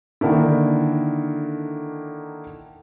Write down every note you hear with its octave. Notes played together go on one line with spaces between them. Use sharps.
D3 D#3 A#3 D4 E4